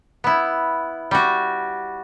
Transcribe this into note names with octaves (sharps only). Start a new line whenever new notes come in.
B3 E4
G3 F#4